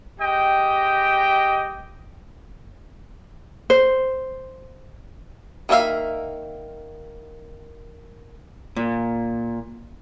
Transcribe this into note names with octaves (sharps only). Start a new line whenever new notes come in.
G#3 G4 D#5 G5
C5
D#3 A#3 B3 E5 F5
A#2